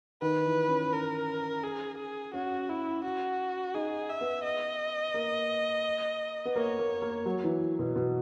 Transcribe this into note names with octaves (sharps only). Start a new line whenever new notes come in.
D#3 B4
E3
C#4
C#4 A#4
G#4
G#4
C#4 F#4
E4
F#4
D#4 G#4
E5
B3
D#5
A#3
B3
A#3 C#5
A#3
A#3
F#3
E3
B2
B2